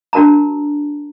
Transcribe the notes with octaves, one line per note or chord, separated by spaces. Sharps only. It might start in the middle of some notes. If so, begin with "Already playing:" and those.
D4 F#4 A#4 A5 A#5